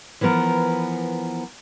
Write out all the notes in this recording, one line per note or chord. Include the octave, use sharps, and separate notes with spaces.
E3 F3 B3 A#4